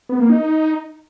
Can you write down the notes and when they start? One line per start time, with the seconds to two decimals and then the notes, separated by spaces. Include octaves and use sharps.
0.09 B3
0.19 A#3
0.29 D#4